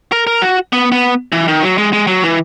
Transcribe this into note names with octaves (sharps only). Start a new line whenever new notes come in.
A#4
A#4
F#4
B3
B3
E3
D#3
F#3
G#3
G#3
F#3
E3